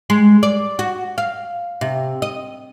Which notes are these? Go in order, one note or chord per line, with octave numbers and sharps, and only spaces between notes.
G#3
D5
F#4
F5
C3
D#5